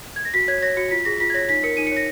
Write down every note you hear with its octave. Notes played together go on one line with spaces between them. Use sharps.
G#6
A#6
F#4 B6
C#5 G#6
C#5 A#6
F#4 C#7
F4 B6
G#4 A#6
F4 B6
G#6
C#5 A#6
D#4 B6
A#4 C#7
D#4 D#7
C#7
C#5 A#6